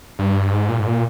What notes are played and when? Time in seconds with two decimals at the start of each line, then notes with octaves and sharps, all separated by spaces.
0.19 G2
0.53 G#2
0.69 A#2
0.79 G#2
0.86 A#2